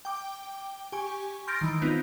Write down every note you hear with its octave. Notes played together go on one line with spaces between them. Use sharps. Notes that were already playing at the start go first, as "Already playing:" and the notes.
G5 D6
G4 G#5 C#6
C6 F6 G6 A6 A#6 D7
D#3 E3 D7
B3 C4 D#4 F4